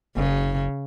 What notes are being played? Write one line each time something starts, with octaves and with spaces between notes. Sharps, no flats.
F#1 C#3